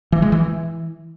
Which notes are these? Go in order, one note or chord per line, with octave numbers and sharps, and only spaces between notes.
E3
G#3
E3